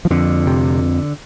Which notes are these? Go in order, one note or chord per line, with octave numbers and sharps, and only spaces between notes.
F3
F2 D3
C3